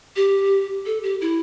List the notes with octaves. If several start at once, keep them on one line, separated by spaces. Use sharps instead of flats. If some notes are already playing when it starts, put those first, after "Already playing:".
G4
A4
G4
E4